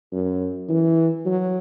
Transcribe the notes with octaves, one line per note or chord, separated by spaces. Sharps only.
F#2
E3
F#3